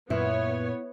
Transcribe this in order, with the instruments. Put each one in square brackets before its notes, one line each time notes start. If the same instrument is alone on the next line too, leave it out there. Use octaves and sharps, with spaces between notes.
[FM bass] F#2 [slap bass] A#2 [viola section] B3 C#5 [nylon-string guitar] E4